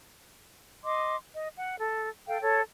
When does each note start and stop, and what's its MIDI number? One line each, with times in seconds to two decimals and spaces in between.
0.84 1.16 75
0.84 1.16 84
0.84 1.16 86
1.34 1.48 75
1.56 1.76 78
1.79 2.10 69
2.28 2.40 69
2.28 2.40 77
2.28 2.40 79
2.42 2.62 69
2.42 2.62 73